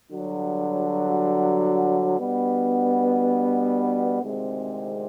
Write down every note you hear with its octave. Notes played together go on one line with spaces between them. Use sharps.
G2 D3 F#3
B2 G3 B3 D4
D2 C3 D#3 G#3 C4